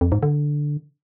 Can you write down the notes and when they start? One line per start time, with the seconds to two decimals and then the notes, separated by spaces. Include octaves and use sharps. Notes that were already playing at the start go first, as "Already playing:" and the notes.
0.01 F2
0.12 G#2
0.23 D3